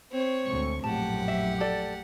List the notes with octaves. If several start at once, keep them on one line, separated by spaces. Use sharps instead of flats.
C4 C#5
D2 G#3 C#6
A#1 F#2 A2 G4 F#5 A5
E5
A4 D5